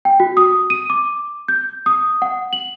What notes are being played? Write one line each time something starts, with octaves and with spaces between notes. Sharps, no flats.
G5
F#4
D#6
D#7
D6
G6
D#6
F#5
F#7